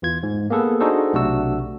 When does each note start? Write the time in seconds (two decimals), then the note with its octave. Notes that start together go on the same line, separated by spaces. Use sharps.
0.02 E2 E3 F4 G#6
0.23 G#2
0.50 A#3 B3 G#4 A4 B4
0.80 D4 D#4 F#4 G#4 A4 C5
1.13 B1 C3 A3 D4 F#4 E6